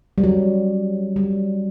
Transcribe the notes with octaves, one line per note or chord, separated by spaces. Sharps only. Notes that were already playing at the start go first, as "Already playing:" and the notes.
G3
F#3
G3